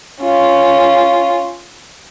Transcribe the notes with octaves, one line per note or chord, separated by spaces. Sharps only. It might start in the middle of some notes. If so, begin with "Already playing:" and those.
C#4 F4